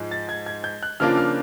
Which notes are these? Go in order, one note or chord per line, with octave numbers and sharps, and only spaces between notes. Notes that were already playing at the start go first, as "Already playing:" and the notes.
Already playing: G#2 F3 G#3
A6
G#6
G#6
G6
F#6
C#3 F3 A#3 D4 F4 F6
F6